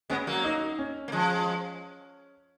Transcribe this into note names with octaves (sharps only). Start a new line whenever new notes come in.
G#3 B3 C#4
F#3 A#3
D#4
C#4
A#3
F3 G#3